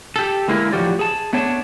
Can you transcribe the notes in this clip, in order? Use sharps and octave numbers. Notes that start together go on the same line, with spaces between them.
G4 A4
D3 G#3 A#3 E4 G#4 A#4
A2 F3 F#3 F#4 G4 D5
G#4 A5
A3 B3 D4 C#5 A5